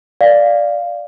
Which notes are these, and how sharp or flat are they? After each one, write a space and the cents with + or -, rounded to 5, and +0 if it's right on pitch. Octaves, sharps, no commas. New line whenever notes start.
D5 +0 F5 -5